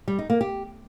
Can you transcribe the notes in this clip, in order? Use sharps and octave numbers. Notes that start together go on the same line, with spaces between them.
G3
D#4
A#3
G4